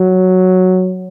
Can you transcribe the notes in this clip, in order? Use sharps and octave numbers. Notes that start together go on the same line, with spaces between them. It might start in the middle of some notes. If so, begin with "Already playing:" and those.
Already playing: F#3